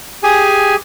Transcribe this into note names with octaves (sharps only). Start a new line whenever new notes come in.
G4 G#4 G#5